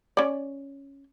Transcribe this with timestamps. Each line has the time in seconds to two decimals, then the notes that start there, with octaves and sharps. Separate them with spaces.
0.17 C#4 D5